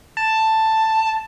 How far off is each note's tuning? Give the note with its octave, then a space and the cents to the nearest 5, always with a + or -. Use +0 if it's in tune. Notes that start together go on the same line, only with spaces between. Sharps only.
A5 +5